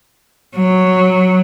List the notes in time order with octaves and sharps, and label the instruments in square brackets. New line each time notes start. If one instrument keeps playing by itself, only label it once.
[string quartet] F#3